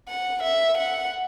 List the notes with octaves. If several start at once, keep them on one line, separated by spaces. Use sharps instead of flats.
F#5
E5
F#5